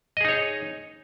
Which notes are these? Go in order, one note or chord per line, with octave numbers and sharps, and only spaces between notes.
D#4 G#4 C#5 D#5